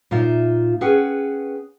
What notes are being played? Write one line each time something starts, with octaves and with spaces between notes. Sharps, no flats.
A#2 D#4 F4 E5
C#4 G#4 B4 F#5 G5